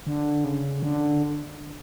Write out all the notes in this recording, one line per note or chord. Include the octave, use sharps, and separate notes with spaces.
D3
C#3
D3